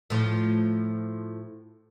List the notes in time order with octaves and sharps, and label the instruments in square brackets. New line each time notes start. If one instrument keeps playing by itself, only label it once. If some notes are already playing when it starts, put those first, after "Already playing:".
[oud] A2 F3